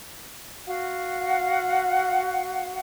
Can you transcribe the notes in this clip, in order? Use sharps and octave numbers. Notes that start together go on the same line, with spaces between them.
F#4 F5 F#5